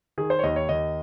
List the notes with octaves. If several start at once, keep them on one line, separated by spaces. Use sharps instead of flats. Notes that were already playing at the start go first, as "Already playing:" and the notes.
D#3 G#4
C5
C#5
D#2 D#5
C#5
D#2 D#5